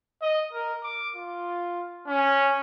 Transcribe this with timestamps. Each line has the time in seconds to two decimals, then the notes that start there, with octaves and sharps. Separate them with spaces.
0.22 D#5
0.53 A#4
0.83 D6
1.16 F4
2.07 C#4